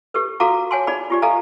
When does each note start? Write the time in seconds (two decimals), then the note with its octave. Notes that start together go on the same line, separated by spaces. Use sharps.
0.14 G4 A4 B4
0.40 F#4 A4 F5 F#5 A#5 D6
0.71 C#5 F#5 G#5 A5 C6
0.87 D#4 G#4 D5 F#5 B5
1.10 F4 G4 D5
1.22 A4 D#5 F5 G#5 A#5